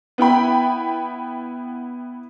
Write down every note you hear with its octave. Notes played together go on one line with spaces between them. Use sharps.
B3 E4 G5 B5